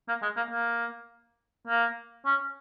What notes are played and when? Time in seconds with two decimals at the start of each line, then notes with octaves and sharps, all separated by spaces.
0.09 A#3
0.22 G#3
0.37 A#3
0.51 A#3
1.67 A#3
2.26 C#4